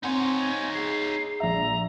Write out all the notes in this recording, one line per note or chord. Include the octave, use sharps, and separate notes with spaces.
C4 D#4 C#5 F#5 G#5 C6
G#4 C7
A#1 E5 A#5